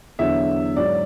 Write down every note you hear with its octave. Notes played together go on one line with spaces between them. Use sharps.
E2 D3 F#3 E5
G#2 F#3 D5